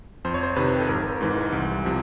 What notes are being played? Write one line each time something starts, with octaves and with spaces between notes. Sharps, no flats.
F2 C5
C#5
C5
C3 D#3 B4
A4
G#1 A#4
G#2 E3
C2
C3 F3